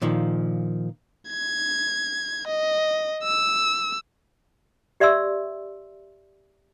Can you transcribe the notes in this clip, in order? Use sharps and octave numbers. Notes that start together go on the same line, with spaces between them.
A#2 D#3 F3
G#6
D#5
E6
G4 D5 E5 C6 E6